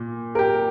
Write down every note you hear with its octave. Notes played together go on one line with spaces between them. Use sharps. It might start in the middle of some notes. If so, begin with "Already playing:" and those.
Already playing: A#2
A#4
G4